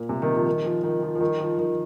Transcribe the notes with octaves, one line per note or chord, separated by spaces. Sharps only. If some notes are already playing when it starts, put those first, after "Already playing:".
Already playing: A#2
C3
D#3
F3
D#3
F3
D#3
F3
F3
D#3
F3
D#3